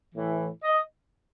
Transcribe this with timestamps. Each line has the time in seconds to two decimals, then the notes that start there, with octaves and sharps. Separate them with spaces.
0.13 A2 E3
0.63 D#5